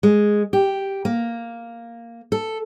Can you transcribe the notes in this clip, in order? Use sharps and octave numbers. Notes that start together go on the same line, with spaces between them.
G#3
G4
A#3
A4